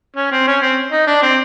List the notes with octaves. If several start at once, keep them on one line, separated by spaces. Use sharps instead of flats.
C#4
C4
C#4
C4
D#4
D4
C4